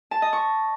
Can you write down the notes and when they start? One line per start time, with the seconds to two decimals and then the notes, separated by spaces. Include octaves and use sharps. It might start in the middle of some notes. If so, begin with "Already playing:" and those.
0.11 A5
0.22 D#5
0.33 C#6